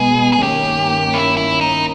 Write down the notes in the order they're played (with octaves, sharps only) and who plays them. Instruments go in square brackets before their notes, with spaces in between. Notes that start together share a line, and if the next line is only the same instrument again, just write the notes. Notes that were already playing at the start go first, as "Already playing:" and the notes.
Already playing: [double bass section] B2 G#3 B3 [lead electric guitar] G#4
[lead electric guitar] G#4
[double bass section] G2 D#3 A#3 C#4 [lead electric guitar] G4
[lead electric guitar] E4
E4
D#4